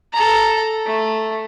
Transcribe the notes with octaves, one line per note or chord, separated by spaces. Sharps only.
A4 A#5
A3